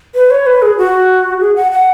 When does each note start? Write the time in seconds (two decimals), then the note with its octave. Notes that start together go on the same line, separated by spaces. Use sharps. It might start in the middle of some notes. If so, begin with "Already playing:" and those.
0.15 B4
0.31 C#5
0.46 B4
0.62 G#4
0.78 F#4
1.40 G#4
1.56 F#5
1.72 F#5